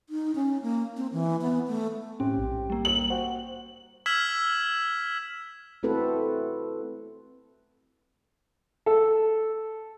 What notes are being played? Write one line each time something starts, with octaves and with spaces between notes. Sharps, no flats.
D#4
C#4
A#3
C4
E3
B3
A3
A2 C4 C#4 G4
A#1 G#2
G3 A#3
D#2 F#7
F#4 C5 G5
E6 F6 G#6 B6 E7 F#7
A3 C4 E4 F#4 A4 B4
A4